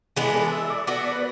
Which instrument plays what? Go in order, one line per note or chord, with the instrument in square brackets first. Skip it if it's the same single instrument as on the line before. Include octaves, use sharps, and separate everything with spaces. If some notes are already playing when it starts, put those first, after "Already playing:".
[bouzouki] E3 G#3 B3 D4 [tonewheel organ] G#4
[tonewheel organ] A4
E5
D5
[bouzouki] B3 F#4 A4 [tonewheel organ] D5
[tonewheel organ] B4